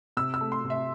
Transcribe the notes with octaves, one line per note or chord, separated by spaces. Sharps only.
C3 E6
E6
A3
C6
C3
E5